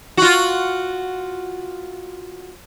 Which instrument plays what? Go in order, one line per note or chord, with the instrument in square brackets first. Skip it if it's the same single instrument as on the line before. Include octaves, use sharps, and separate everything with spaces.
[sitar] F4 F#4